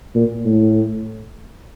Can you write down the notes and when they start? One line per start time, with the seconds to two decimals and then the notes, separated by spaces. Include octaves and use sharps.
0.15 A#2
0.45 A2